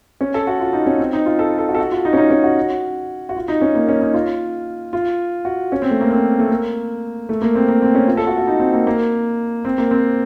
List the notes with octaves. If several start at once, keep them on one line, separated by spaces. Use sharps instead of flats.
C#4
A4
F#4
F4
D#4
C#4
C4
D#4
F4
A4
A4
F#4
A4
F#4
F4
D#4
C#4
D#4
C#4
F#4
F#4
F4
D#4
C#4
A#3
C#4
D#4
F4
F4
F#4
C#4
C4
A3
A#3
C4
A3
A#3
A3
A#3
C4
A#3
C4
C#4
F4
A4
F#4
F#4
D#4
C4
A#3
A#3
C4
A#3
C4